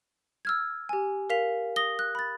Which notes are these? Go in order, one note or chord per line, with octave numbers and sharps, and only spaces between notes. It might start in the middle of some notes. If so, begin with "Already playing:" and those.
E6 F6 G#6
G4 G#5
A#4 F5 B6 F7
D#6 A#6 G7
F#6
B5 A6